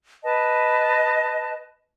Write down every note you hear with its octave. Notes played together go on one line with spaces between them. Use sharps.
B4 D#5 A5